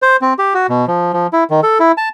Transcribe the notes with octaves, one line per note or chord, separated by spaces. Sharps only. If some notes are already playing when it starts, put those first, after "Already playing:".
C5
C4
G4
F#4
B2
F3
F3
E4
D#3
A4
E4
A5